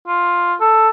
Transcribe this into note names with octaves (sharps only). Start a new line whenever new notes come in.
F4
A4